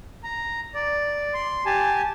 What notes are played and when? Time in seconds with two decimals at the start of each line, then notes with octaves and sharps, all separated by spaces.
0.24 A#5
0.74 D5
1.34 C6
1.66 G4 G#5 A5